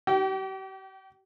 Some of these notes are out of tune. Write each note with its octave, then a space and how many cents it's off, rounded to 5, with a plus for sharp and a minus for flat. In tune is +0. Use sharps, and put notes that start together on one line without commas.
G4 -40 G5 -20